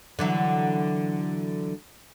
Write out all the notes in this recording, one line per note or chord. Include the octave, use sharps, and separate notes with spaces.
D3 E3 F#3